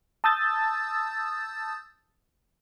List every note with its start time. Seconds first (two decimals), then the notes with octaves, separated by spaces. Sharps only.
0.24 A5 D#6 E6 G6 A6